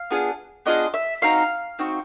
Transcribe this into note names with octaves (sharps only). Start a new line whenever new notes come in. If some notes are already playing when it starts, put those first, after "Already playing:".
Already playing: F5
B3 D4 F4 G#4
B3 D4 F4 G#4 D#5
E5
C4 D#4 F#4 F5
C4 D#4 F#4